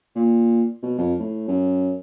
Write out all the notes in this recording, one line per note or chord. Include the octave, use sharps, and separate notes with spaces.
A#2
B2
F2
A2
F#2